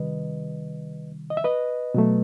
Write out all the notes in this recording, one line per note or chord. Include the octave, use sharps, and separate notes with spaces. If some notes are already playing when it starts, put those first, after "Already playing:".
Already playing: C3 D#3 G3 B4 D#5
D#5
E5
B4 D#5
B2 F#3 A3